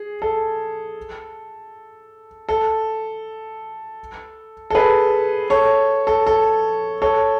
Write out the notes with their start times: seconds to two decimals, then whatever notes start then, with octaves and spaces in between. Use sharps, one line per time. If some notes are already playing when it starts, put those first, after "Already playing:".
Already playing: G#4
0.22 A4
2.49 A4
4.70 A4
4.75 G#4 B4
5.50 A4 C#5
6.07 A4
6.27 A4
7.02 A4 C#5